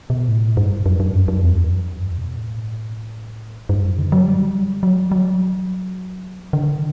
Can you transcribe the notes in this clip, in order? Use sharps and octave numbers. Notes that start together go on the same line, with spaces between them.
B2
A2
G2
F#2
F#2
G2
F#2
E2
F#2
G2
B2
A2
G2
F#2
D3
F#3
G3
F#3
F#3
D3